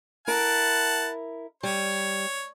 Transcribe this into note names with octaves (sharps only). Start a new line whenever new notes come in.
E4 A#4 F#5 A5
G3 C#5